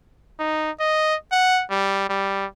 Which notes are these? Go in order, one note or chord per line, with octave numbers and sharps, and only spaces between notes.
D#4
D#5
F#5
G3
G3